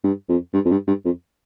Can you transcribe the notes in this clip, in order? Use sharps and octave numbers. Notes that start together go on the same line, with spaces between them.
G2
F2
G2
F2
G2
G2
F2